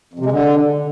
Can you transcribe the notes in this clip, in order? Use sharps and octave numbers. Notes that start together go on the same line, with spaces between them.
F2
C3
G#3
D3